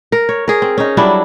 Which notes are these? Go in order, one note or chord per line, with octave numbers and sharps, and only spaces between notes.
A#4
C#5
G#4 A#4
C4
C#4 D#4
F#3 G3 D4 E4